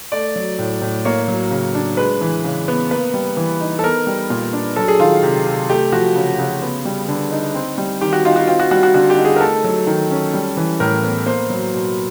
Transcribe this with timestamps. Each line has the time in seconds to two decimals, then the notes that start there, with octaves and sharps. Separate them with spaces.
0.12 A3 D5
0.36 F#3
0.59 A2
0.81 A2
1.05 A#3 C#5
1.28 F#3
1.51 C#3
1.75 D4
1.97 G#3 B4
2.21 E3
2.44 C#3
2.68 B3
2.91 A#3 B4
3.14 G3
3.37 E3
3.61 D#4
3.79 A4
3.84 B3 A#4
4.07 G3
4.30 A#2
4.53 D4
4.76 F#3 A4
4.88 G#4
5.00 D#3 F4
5.23 C3
5.47 C3
5.70 A3 G4
5.92 F3 F#4
6.15 C#3
6.38 C#3
6.62 B3
6.85 G3
7.08 D3
7.31 D#4
7.54 C4
7.78 G3
8.01 D#3 G4
8.13 F#4
8.25 D#4 F4
8.36 F#4
8.47 C4 F4
8.59 F#4
8.71 G3 F#4
8.83 F#4
8.94 D3 F#4
9.10 G4
9.17 D#4
9.25 G#4
9.36 A#4
9.41 A3 A4
9.64 F#3
9.87 D#3
10.11 C#4
10.34 G3
10.57 E3
10.80 A2 A#4
11.03 B3
11.26 A#3 C5
11.50 F#3
11.73 B2